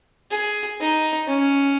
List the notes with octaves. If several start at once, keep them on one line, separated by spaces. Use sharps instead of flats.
G#4
D#4
C#4